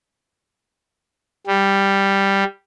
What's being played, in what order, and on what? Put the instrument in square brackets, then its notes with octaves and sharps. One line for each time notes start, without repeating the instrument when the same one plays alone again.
[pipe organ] G3